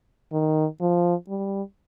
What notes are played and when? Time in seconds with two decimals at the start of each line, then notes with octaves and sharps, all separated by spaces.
0.32 D#3
0.81 F3
1.29 G3